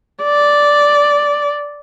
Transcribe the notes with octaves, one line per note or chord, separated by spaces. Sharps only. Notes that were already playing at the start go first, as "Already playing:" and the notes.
D5